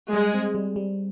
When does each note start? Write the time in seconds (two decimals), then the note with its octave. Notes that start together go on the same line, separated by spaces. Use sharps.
0.13 G3 G#3
0.34 C4
0.55 G3
0.76 G3